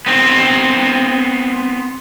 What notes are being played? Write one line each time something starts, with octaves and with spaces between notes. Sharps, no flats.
B3 C4